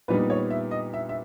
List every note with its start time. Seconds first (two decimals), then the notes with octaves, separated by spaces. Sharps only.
0.08 A#2 G3 B3 D#4 B4
0.30 C#5
0.50 E5
0.71 D#5
0.94 E5
1.09 E5